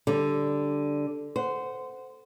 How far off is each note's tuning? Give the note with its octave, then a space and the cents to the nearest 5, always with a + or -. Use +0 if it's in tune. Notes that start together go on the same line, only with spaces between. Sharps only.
D3 +0 G3 +0
C5 -20 F#5 +0